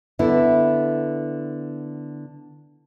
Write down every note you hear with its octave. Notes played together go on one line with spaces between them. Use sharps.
D3 B3 E4